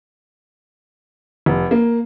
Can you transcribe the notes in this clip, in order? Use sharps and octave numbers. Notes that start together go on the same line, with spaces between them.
F1
A#3